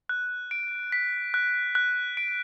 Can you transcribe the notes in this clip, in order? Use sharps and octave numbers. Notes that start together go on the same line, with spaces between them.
F#6
D7
B6
F#6
F#6
D7